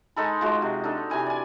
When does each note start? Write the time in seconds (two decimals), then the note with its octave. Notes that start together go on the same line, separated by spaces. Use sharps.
0.16 G#3 D#4 A4 B5
0.41 F3 G#3 F#4
0.62 C3
0.84 D4 D#4 A4
1.10 C3 E3 G#5 B5
1.26 D5 G#5